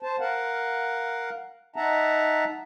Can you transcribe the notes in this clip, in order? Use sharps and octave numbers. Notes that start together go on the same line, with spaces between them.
C5 A5
A#4 F5 F#5
D#4 E5 F#5 A5 A#5